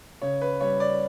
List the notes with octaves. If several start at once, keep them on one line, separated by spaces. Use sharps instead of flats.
C#3 C#5
B4
G3 C#5
D5